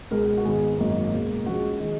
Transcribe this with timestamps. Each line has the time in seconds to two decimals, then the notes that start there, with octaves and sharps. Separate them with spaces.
0.11 C#2 B2 G#3 B3 A#4
0.38 F#4
0.45 G#1 G#2 D#3 G#3 B3 G#4
0.78 G#1 F#2 D#3 A#3
1.12 C#2 B2 A#3
1.46 C#2 C#3 F3 G#3 F#4
1.80 D#3 G#3